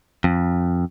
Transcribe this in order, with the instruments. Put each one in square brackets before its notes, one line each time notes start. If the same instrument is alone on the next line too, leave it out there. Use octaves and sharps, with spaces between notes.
[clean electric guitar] F2